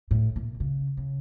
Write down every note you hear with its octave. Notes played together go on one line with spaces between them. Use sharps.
A2
A#2
C#3
C#3